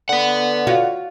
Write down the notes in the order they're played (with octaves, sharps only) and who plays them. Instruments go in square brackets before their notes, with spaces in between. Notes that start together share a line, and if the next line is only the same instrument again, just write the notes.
[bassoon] D3 [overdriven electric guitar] B4 F#5
[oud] F4 F#4 C#5